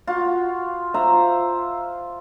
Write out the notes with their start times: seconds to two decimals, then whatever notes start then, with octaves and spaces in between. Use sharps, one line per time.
0.07 F4 F#4
0.94 F4 C5 E5 A#5